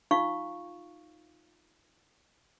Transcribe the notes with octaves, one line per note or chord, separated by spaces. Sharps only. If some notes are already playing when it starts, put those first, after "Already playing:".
D#4 F4 F5 C#6